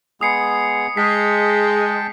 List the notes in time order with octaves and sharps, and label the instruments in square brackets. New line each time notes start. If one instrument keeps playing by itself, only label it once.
[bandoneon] G#3 B3 G#4 [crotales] D#6 C7 C#7
[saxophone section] G#3 [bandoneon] G5 A5 [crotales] B6
[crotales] B6